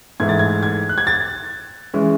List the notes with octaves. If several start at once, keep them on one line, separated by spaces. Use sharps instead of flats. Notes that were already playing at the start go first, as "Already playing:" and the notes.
G#2 E3 A3 G#6
A6
G#6
G#6
F#6
G#6
A6
E3 G#3 C#4